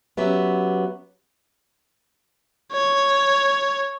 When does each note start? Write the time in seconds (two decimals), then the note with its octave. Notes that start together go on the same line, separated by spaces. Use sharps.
0.17 F#3 B3 C#4 G4 E5
2.72 C#5